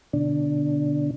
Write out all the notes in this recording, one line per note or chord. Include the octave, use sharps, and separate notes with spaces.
B2 D3 D4